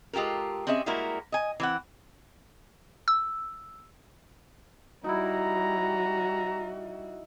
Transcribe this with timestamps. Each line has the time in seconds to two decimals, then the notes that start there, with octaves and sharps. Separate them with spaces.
0.13 G#3 F4 G4 A4 A#4
0.67 C4 C#4 G#4 D#5 E5
0.86 G3 G#3 A#3 E4 F#4 A#4
1.32 D#5 G#5
1.60 E3 C4 F#5
3.08 E6
5.04 G3 D#4 E4 F#4 A#5